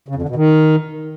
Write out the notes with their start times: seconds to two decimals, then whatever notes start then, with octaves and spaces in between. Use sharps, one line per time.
0.08 C#3
0.15 F2
0.22 D3
0.29 B2
0.36 D#3